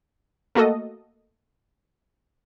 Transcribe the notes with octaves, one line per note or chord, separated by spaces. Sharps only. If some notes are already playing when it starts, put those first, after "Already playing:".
A3 A#3 F#4 A4 D#5